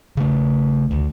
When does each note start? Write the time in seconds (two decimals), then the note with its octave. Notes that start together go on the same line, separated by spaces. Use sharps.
0.17 C#3 A3
0.91 D2